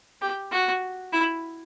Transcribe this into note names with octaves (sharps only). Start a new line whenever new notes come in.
G4
F#4
E4